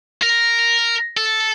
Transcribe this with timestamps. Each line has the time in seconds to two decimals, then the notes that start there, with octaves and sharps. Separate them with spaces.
0.22 A#4
1.17 A4